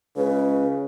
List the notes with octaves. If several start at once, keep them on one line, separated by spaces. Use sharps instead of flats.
C#2 C#3 B4